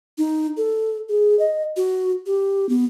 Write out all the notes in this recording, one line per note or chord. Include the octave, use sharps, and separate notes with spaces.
D#4
A4
G#4
D#5
F#4
G4
B3